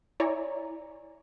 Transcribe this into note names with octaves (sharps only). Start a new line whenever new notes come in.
E4 C#5 D5 G#5 A#5